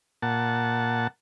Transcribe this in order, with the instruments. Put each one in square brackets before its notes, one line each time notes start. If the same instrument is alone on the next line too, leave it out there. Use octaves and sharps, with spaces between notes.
[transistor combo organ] A#2 F#5 A5